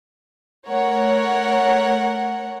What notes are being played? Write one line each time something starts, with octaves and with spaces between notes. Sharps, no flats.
A3 A#4 C#5 F#5